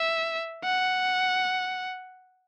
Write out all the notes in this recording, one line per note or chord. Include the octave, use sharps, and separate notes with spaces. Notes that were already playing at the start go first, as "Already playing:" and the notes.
Already playing: E5
F#5